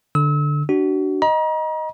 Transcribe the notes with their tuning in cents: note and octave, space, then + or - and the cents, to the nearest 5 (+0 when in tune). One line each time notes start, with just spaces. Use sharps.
D3 +0 E6 -35
D4 +0 F#4 +30
D#5 +0 A#5 +35